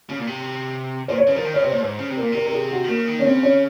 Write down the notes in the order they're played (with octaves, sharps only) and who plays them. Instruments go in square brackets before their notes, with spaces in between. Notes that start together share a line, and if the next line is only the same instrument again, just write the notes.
[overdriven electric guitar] C#3
A#2
C3
[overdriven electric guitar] A#2 [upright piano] C5
[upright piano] C#5
[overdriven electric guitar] C#3 [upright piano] C5
[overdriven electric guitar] F3 [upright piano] A#4
[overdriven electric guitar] D#3
[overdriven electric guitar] C#3 [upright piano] C#5
[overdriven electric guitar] C3 [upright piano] C5
[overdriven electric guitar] A#2 [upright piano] C#5
[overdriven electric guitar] G#2 [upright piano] C5
[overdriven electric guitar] C#3
C3
[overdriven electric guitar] A#2 [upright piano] A#4
[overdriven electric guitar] C3 [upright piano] A#4
[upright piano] A#4
G#4
F#4
[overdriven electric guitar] D#3
[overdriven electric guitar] C#3 [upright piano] A#3
[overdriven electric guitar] D#3
[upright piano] C#4
[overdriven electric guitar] C#3 [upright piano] C4
[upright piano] C#4